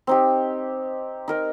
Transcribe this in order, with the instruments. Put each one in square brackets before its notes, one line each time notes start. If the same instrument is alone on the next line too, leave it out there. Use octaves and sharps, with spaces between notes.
[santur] C4 D#4 G4
D#4 A#4 D#5